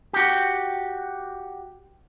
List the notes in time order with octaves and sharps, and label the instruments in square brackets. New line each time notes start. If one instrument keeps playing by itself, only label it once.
[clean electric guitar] F#4 G4